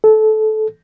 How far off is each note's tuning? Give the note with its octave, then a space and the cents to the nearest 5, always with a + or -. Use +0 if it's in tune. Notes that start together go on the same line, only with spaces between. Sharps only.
A4 -20